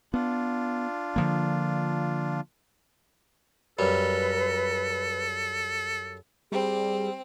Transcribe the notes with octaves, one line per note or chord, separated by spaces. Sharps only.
B3 D4 F4
D3 F3 A#3
F#2 G3 A4 B4
G3 C4 G#4